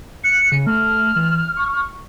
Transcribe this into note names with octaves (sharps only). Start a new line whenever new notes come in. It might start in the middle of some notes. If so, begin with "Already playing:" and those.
F#6 C#7
C#3
A3 F6
E3
C#6